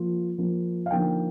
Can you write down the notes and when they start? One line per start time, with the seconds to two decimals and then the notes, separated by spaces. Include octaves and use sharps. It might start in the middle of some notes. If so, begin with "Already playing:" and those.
Already playing: F3 A#3 F4
0.38 F3 A#3 F4
0.86 F5
0.91 D3 F3 A#3 D#4 G5